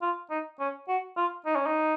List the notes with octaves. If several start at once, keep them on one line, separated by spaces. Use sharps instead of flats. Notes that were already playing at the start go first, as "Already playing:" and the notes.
F4
D#4
C#4
F#4
F4
D#4
C#4
D#4